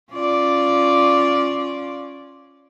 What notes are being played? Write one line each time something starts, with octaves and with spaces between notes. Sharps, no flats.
C#4 F4 D5